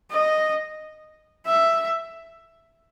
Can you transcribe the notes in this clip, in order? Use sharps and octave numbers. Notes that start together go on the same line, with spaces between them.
D#5
E5